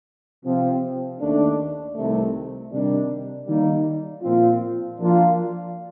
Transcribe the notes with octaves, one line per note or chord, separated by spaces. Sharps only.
C3 F3 C4
D#2 D#3 A3 D4
C2 C3 D#3 A3
C3 D#3 G3 D4
D#3 G3 A#3 D#4
A#2 F3 C4 F4
F3 A#3 D4 F4